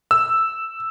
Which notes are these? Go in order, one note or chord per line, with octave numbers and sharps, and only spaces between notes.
E6